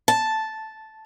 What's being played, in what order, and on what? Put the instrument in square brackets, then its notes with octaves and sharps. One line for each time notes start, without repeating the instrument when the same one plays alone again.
[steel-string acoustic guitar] A5